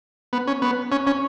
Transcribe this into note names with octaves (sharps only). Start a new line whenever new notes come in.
B3
C#4
B3
C#4
C#4